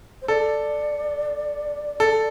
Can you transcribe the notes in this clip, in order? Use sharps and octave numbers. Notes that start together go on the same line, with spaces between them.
C5
A4 D5
A4